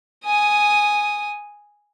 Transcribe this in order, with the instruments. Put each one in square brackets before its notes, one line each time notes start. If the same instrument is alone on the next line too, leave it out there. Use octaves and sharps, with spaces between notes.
[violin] G#5 D#6